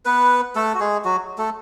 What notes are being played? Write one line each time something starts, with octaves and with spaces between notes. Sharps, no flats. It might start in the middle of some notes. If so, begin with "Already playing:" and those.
B3 B4
A3 A4
F#4
G#3 G#4
F#3 F#4
A3 A4